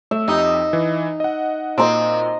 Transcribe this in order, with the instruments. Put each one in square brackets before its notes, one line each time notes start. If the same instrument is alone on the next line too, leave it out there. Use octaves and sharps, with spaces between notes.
[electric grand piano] A3 [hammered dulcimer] E5
[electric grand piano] F2 G4 D#6 [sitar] D#4
[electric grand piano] E3
D#5 F#5
[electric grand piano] A#2 [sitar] C4 [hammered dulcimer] D#5 A#5 C6